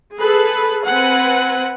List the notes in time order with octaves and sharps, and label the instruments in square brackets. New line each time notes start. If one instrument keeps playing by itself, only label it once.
[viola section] G#4 A4 B4
C4 B4 F#5 G#5